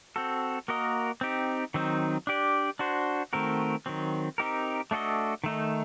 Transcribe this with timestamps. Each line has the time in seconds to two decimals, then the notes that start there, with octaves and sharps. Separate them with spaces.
0.16 C4 F#4 A4
0.68 A#3 F#4 A#4 D#5
1.21 C4 D#4 G4
1.74 D#3 F#3 C4 D#4
2.27 D4 G4 D5
2.79 D4 F#4 C5
3.33 D#3 A3 C4 F#4 A#4
3.86 D#3 F#3 C4
4.38 C4 D#4 G4 A#4
4.91 A3 D4 F#4 A4 D#5
5.44 D#3 A3 D#4